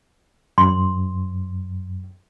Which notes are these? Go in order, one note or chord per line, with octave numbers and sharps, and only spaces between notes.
F#2 C6